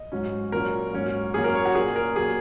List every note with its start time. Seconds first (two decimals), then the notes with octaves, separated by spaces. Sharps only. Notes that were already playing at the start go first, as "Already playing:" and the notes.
Already playing: D#5
0.12 G#2 F#3 C#4
0.52 A#2 F#3 C#4 A#4
0.93 G#2 F#3 A#3 C#4
1.34 F#2 F#3 A#3 C#4 G#4
1.44 A#4
1.55 C#5
1.65 F#4
1.75 A#2 A#3 C#4 G#4
1.96 A#4
2.15 A#2 F#3 A#3 G#4